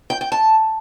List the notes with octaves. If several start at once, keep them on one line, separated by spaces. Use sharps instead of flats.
G5
G5
A5